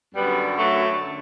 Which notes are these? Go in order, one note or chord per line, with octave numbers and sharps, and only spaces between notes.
F#2 D3 G3 B3
F#3 A3
D3